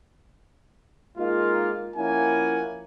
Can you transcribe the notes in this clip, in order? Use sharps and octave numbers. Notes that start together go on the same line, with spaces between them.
G#3 A#3 D#4 F4
F3 A#3 C#4 E4 F#5 G#5